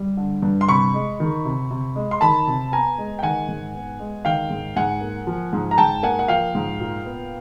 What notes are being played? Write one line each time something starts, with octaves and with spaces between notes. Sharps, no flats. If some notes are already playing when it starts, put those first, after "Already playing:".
Already playing: G3
D3
G2
C6
C3 B5 C#6
G#3
D#3
C3
C3
G#3
C6
D#3 A5 B5
C3
B3 G#5 A#5
G#3
G5
D#3 F#5 G#5
G#2
B3
G#3
D#3 F5 G5
G#2
G#2 F#5 G#5
A#3
F3
G#2
A#5
G#2 G5 A5
A#3 F#5 G#5
F#5
F3 F5 G5
G#2
A#2
B3